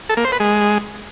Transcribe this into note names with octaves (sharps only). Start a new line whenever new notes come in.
A4
A#3
C5
B4
G#3